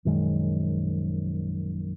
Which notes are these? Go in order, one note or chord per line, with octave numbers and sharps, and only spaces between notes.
A#1 F#2 D#3 G#3